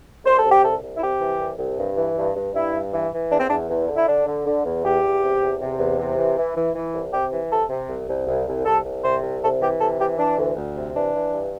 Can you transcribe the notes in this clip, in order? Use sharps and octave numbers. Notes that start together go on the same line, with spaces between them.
C2 C5
A4
C3
G4
C2 A4
C2
E4
C3 G4
E3
C2
C2
G2
E3
G2
G2
G2 E4
G2
E3
E3
E2 D4
C4
E2 D4
E2
D3
E4
D3 D4
D3
D3
E2
E2 G4
E2
C3
E2
C3
E2
C3
E3
E3
E3
E3
C2
C3 G4
E3
C3 A4
C3
C2
C2
C2
C2
C2 A4
C2
C3 C5
C2
C3 A4
E3 G4
C3 A4
E3 G4
E3 D4
D2
D2
C3
E3 D4
E3
G2